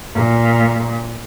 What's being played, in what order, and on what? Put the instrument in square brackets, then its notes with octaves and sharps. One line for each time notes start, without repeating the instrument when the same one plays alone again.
[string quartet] A#2